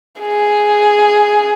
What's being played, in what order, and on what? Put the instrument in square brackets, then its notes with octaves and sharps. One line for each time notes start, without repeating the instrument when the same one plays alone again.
[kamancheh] G#4